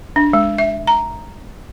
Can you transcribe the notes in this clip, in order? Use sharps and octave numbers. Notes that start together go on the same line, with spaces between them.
D4
G#3
E5
A#5